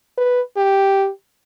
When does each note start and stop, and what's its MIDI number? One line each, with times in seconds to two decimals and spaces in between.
0.18 0.41 71
0.57 1.10 67